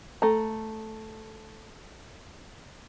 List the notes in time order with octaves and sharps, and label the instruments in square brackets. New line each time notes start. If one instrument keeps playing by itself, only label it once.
[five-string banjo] A3 A#5